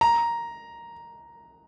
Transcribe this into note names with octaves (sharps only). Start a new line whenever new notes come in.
A#5